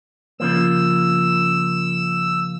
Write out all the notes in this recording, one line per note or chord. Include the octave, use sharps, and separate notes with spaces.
C#3 F3 A#3 E6